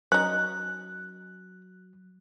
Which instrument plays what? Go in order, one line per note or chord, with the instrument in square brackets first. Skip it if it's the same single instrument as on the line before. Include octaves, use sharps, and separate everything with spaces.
[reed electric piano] F#3 [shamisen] C#4 D#4 [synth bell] F#6